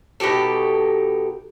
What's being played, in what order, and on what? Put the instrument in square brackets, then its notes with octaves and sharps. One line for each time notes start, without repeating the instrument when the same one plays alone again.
[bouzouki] B2 D#4 G4 A4